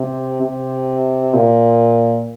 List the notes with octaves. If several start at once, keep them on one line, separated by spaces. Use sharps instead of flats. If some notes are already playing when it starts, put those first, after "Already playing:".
Already playing: C3
C3
A#2